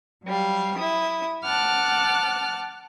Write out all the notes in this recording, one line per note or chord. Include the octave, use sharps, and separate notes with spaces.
F#3 G3 F5
E4 D#6
F#5 A5 D6 F6 F#6